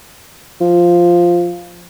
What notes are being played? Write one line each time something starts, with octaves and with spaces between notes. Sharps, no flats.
F3